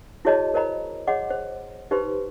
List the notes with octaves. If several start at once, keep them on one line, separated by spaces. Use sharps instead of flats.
E4 F#4 G#4 C#5 D#5 A5
A#4 C5 D#5 A#5 B5
G#4 C#5 D#5 F#5 C6 D6
C5
D#4 G4 B4 C5 B5 C6